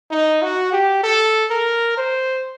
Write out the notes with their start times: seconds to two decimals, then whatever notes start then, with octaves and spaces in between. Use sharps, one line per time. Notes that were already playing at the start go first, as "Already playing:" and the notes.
0.11 D#4
0.42 F#4
0.72 G4
1.03 A4
1.50 A#4
1.97 C5